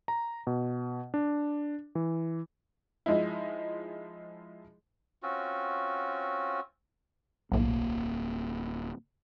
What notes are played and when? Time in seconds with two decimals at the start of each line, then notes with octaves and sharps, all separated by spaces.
0.08 A#5
0.47 B2
1.14 D4
1.95 E3
3.06 F3 G#3 D#4 E4
5.23 C4 C#4 F4 F#4
7.52 D1 B1 A2 A#3